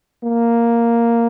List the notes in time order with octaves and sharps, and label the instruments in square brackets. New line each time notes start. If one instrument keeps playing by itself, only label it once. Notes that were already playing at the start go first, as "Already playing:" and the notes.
[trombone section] A#3